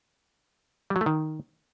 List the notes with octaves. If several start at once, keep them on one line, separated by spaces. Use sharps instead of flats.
G3
F#3
A3
D#3